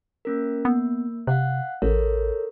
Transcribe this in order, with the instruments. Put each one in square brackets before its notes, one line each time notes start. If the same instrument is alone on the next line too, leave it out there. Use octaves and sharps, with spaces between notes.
[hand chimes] A#3 C#4 A#4
[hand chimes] A#3 [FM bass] B3
[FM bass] C3 [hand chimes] F5 F#5 F#6
[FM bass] A1 [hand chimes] A4 A#4 C#5